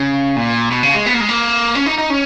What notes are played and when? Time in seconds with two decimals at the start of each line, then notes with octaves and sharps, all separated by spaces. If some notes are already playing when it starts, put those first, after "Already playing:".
Already playing: C#3
0.36 A#2
0.71 B2
0.83 C#3
0.95 G#3
1.06 B3
1.14 A#3
1.21 G#3
1.29 A#3
1.75 C#4
1.86 D#4
1.98 D#4
2.10 C#4